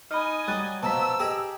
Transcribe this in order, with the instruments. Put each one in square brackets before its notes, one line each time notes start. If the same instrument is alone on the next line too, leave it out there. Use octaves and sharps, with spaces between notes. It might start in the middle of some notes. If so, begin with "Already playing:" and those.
[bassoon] D#4 [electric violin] D#5 G#5 [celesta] B5 F6
[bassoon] F#3 [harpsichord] G3 [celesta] D#6 F#6 A6
[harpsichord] B2 F3 [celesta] A5 A#5 B6 [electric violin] E6
[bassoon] G4 [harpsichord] G#4 D#5